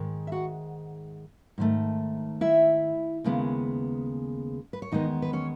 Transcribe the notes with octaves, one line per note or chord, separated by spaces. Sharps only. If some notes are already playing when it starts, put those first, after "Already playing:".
Already playing: G#2 D#3 G#3
E5
F#4 F#5
G#2 D#3 A3
E4 E5
D#2 C#3 G#3 B3
B4
C#5
E2 D#3 G#3 B3 D#4 D#5
B4
C#4 C#5